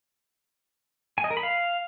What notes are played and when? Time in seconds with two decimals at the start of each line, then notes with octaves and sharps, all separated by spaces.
1.18 G#5
1.24 D#5
1.30 A#4
1.37 B5
1.43 F5